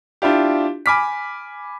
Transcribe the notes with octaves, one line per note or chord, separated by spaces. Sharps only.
D4 E4 F4 G4
G#5 B5 D6 F6 B6